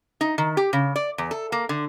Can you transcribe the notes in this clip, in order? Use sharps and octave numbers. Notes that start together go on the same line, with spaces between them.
D#4
D#3
G4
C#3
D5
E2
A4
A#3
D3